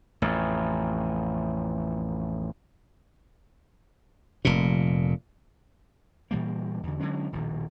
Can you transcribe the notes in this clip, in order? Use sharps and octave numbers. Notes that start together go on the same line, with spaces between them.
A1 F2
F1 A#2
A#2 E3 G3 A#3
E2 D3
D3 F#3 G#3 C#4
D#1 A#1 B2 D#3